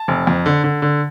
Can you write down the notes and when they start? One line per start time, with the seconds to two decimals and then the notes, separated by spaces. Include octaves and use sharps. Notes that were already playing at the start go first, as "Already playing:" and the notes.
Already playing: A5
0.08 F1
0.27 F2
0.46 D3
0.64 D3
0.82 D3